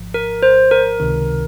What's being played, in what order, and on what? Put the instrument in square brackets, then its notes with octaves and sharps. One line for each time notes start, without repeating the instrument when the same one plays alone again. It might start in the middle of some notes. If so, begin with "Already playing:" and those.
Already playing: [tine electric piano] G#1 G#2 F3
[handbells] A#4
C5
A#4
[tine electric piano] C#2 C3 D#3